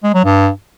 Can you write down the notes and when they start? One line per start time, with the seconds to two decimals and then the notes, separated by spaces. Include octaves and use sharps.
0.03 G#3
0.14 F#3
0.24 G2